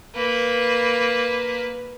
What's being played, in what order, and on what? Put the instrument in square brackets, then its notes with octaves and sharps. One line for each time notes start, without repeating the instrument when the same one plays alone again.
[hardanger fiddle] A#3 B4